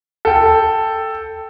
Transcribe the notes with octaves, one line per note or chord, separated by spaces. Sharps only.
A4 G5